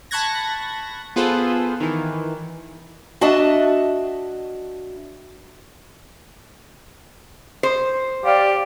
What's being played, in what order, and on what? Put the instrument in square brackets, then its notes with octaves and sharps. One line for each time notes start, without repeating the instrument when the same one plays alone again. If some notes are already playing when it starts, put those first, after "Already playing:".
[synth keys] A5 B5 C#6 F#6 G#6 A#6
B3 F4 G#4 A4 B4 C5
D#3 E3
[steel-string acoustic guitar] D4 F#4 D#5 E5 A5
[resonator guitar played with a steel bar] C5
[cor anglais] G4 [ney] D5 [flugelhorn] F5